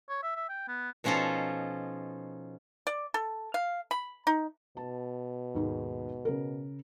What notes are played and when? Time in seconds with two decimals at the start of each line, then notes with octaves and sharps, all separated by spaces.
0.09 C#5
0.23 E5
0.36 E5
0.49 G5
0.68 B3
1.04 B2 F3 C#4 D#4 F4 A4
2.87 D5
3.14 A4
3.54 F5
3.91 B5
4.27 D#4
4.77 B2 A5
5.55 D#2 G#2 G#3
6.25 C#3 A#4